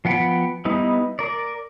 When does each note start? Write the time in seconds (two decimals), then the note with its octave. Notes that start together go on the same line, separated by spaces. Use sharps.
0.05 F3 B3 F#5 G5 B5
0.65 G3 B3 D#4 E4
1.19 A#4 D5